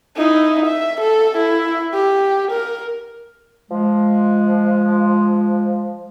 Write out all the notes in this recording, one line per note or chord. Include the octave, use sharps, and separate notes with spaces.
D#4 E4
E5
A4
E4
G4
A#4
F3 G#3